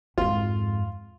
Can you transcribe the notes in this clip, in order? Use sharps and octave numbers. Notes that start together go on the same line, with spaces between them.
F2 G#2 F4